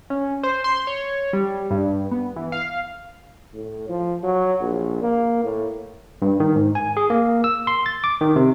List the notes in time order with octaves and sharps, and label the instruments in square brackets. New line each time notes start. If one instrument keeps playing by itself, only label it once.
[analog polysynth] C#4
C5
C6
C#5
G3
G2
B3
E3
F5
[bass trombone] A2
F3
F#3
A#1
A#3
A2
[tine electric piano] G2
D#3
G#2
G#5
G#4
A#3
E6
C6
A6
D6
D#3
C3